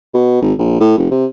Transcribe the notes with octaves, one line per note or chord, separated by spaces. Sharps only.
B2
G#1
A#1
A2
F1
C3